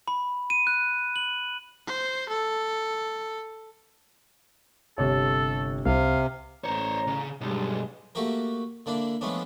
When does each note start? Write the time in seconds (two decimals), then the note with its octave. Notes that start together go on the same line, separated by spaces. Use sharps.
0.08 B5
0.50 D#7
0.67 F#6
1.16 F#7
1.87 C5
2.29 A4
4.98 G1 C3 A4 C#5
5.86 C2 C3 F5
6.64 A1 C5 C#5 A#5
7.07 C#3
7.41 B1 G2 G3 G#3
8.15 A3 A#3 F#4 G4 A#4
8.86 D3 A#3 D4 E4
9.21 F3 G#3 A3 B3 C#4 D4